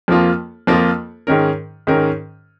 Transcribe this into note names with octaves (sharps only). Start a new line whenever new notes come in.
F2 F3 A#3 F4
F2 F3 A#3 F4
G#2 D#3 C#4 A#4
G#2 D#3 C#4 A#4